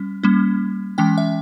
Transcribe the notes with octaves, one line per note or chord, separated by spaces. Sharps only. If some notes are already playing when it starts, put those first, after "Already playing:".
Already playing: G3 C#4
G3 A#3 C#4
E3 G#3 C#4 G5
E5